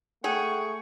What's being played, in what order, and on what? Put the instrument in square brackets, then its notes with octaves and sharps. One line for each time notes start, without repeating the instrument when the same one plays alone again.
[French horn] A3 [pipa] G#4 [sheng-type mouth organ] F#5 G5 [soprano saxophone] C#6